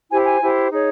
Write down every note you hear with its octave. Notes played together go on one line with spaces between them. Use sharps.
E4 G4 C5 G#5
G#5
E4 G4 C5
D#4 G#4 C#5